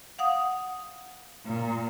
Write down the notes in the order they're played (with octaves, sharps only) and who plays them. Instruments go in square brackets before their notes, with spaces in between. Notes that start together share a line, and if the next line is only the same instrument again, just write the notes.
[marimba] F5 F#5 D#6
[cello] A#2